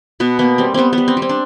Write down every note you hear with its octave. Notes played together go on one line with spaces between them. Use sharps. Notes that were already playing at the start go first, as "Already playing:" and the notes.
B2 B3
A#3 B3
G3 C4
G3 B3 C4
B3
G3
C4
G3
C4
D4